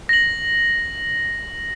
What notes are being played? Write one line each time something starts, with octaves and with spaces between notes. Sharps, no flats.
A#6 F#7